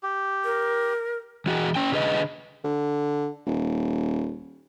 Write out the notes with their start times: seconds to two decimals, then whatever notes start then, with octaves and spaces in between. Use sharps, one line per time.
0.03 G4
0.44 A#4
1.46 E3 F#4 G#4
1.76 C#4 G5
1.92 D3 G#4 B4 D#5
2.64 D3
3.47 D#1